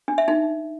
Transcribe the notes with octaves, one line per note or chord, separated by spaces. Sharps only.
D4
E5
D#4